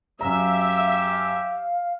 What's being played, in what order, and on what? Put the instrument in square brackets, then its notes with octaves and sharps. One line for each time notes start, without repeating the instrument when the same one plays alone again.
[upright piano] F#2 A#5 [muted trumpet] G4 [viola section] E5 [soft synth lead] F5